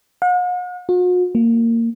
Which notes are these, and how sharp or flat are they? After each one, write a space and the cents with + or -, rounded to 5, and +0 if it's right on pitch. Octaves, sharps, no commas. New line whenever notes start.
F#5 -45
F#4 -45
A#3 -20